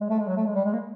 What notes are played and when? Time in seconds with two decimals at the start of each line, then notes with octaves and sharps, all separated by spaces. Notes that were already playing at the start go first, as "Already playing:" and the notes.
0.01 G#3
0.10 A3
0.19 G#3
0.28 F#3
0.37 A3
0.46 G#3
0.55 G3
0.65 G#3
0.73 A#3